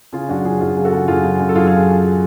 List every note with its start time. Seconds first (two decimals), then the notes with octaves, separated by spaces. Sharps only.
0.13 C#3 F4 G#4
0.29 F#2 D4 F#4
0.44 C#3 F4 G#4
0.60 F#2 F4 G#4
0.77 C#3
0.84 F#4 A4
0.93 C#3
1.08 F#2 F4 G#4
1.24 C#3
1.39 F#2
1.49 A4
1.55 F#2 F4 G#4
1.67 F4 G#4